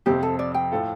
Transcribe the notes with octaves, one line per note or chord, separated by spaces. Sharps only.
F2 C3 F3 C4 G4
A4
D5
G5
A2 A3 F4 A4